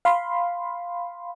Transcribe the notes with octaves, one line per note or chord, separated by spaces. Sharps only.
F5 B5 C6